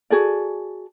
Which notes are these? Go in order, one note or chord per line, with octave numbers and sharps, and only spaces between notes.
F#4 G#4 A4 D5